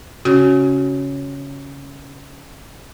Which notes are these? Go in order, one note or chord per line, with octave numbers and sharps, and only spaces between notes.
C#3 F#4